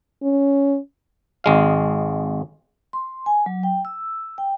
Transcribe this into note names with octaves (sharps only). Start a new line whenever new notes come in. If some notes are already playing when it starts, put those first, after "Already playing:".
C#4
G#1 G#3 F5
C6
G#5
F#3
G5
E6
G5